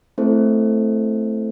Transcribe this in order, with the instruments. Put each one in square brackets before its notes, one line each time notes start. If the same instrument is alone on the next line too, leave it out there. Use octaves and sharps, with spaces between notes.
[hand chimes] A3 C4 E4 A4 C5